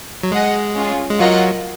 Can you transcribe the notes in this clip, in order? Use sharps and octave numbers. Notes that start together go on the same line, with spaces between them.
F#3
G#3 G#4 D#5 F#5
C#4 F4 G#4
G#3
F#3 F4 A#4 D#5 F#5